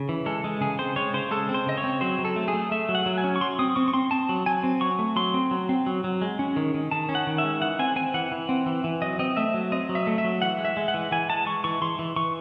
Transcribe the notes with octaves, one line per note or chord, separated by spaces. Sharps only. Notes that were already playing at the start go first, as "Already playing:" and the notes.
Already playing: C#3
E3
G#3 A4
G#3
C#3 G#4
C4 C5
G#3 C#5
C#3 C5
G#3 A4
C4
C5
C#3 D#5
C#5
C4
F#3 C5
F#3
A4
A3
G#4
A3
A3 E5
F#3
F#5
F#3
G#5
C#4
C#6
F#3 C6
C4 D#6
C4 C#6
C#6
C4 C6
C4 A5
F#3
F#3 G#5
C4
F#3 C#6
A3
F#3 C6
C4
F#3
C4
F#3
F#3
G#3
C#4
D#3
D#3
D#3 A5
C#4
F#5
D#3
E5
G#3
E3 F#5
C4 G#5
C4 G#5
E3 F#5
E3
C4
E3
E3
F#3 D#5
C4 D#5
A3 E5
F#3
C4 D#5
F#3
E5
A3
E5
F#3
E3 F#5
G#3
E5
G#3
F#5
E3
E3 G#5
G#3 A5
G#3 C#6
E3 C#6
E3 C6
E3
E3 C#6